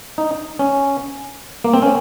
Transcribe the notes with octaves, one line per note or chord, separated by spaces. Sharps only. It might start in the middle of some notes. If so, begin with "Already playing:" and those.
D#4
C#4
A#3
C4
C#4